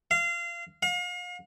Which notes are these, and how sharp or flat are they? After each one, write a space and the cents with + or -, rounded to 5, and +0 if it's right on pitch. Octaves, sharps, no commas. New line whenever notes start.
F5 -25
F5 +40